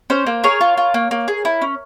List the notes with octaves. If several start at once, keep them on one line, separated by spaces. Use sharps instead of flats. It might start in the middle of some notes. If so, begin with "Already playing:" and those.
C#4 C5
A#3
G#4 A#4 C#5
F4
F4
A#3
A#3
G#4
E4
C#4